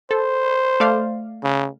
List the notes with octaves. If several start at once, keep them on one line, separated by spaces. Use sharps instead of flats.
A4 C5
A3 D5 F5
C#3